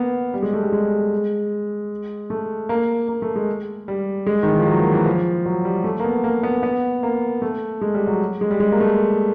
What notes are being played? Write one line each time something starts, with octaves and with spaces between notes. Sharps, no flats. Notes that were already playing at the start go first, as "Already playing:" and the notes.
Already playing: A#3 B3
G3
G#3
A3
G3
G#3
A3
A#3
A#3
A3
G#3
G3
G#3
D#3
E3
F3
F#3
A#3
E3
F3
F#3
G3
A3
A#3
B3
A#3
B3
B3
A#3
A3
G#3
G3
F#3
G#3
G3
G#3
A#3
A3